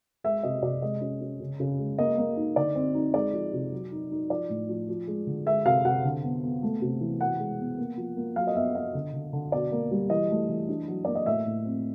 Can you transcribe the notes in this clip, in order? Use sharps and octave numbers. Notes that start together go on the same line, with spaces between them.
G#3 E5
C3 D#5
C3 D5
G#3 D#5
C#4
C#4
C#3
C#3
G#3
A#3 D#5
A#3
D#4
D3 D5
C4
D#4
G#3 D5
F3
C3
F#3
D#4
D#4
F3 D5
A2
F3
F3
G#3
D3
G#3 E5
C3 F5
C3 F#5
D3
B3
B3
A3
C3
E3
B2 F#5
G#3
B3
A#3
F3
A#3
F#3 F5
D#5
B3 E5
B3 D#5
D3
D3
D3
B2 D5
A#3
G3
E3 D#5
A3
E3
D4
F#3
A#3 D5
D#5
A2 E5
A2
C4